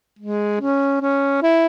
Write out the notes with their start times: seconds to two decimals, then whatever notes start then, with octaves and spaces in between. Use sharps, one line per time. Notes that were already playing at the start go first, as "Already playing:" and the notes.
0.19 G#3
0.61 C#4
1.01 C#4
1.43 E4